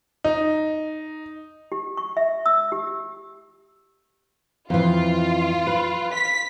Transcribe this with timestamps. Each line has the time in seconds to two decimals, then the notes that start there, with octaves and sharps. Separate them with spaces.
0.24 D#4
1.72 G4
1.97 C#6
2.17 E5
2.46 E6
2.72 G4
4.70 F2 E3 F4
5.67 B4
6.13 B6